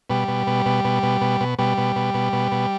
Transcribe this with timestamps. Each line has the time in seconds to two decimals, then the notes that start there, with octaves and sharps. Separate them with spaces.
0.10 B2 G3
0.28 B2
0.47 B2
0.66 B2
0.84 B2
1.03 B2
1.21 B2
1.41 B2
1.59 B2 G3
1.78 B2
1.96 B2
2.14 B2
2.33 B2
2.52 B2